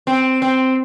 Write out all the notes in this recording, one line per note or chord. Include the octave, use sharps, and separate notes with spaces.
C4
C4